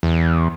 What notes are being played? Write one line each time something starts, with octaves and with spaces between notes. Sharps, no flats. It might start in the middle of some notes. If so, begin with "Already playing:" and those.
E2